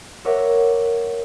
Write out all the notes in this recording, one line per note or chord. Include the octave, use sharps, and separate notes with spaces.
A#4 C#5 E5 F#5 D6